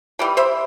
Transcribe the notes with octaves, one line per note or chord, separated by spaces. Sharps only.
E3 G3 G5
C5 E5